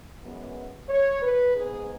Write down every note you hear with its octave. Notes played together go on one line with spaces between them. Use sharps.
F#2 E3 G#3 B3
C#5
B4
G#2 G#3 B3 G#4